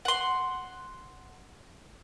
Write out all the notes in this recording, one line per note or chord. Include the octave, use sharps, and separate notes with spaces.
F#5 C6